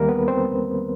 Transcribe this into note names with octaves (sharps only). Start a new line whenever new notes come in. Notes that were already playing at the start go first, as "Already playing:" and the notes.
Already playing: D#2 D#3 G3 A#3 A#4
B3 B4
C4 C5